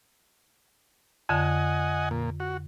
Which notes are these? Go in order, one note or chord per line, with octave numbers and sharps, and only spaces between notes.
F2 D3 D#5 F#5 G#5
A#2
F#4